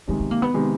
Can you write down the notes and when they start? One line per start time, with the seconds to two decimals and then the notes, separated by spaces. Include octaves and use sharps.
0.08 C3 D#3 G#3 B3
0.20 B3
0.31 A#3
0.42 B3
0.54 C3 D#3 G#3